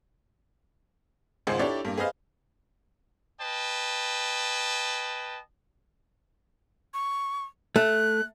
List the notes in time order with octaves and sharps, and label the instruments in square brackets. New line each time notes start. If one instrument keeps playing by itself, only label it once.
[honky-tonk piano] G#1 C#2 G#2 G#4 C5
D4 E4 G4 A4 C#5 D5
G2 A#3
G#4 B4 C5 D#5 F5
[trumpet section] B4 D#5 G5 A5
[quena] C#6
[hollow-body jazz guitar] A3 [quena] F#6